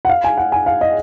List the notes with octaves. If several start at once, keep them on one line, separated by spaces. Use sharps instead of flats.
F#5
F5
G#5
F#5
G#5
F5
D#5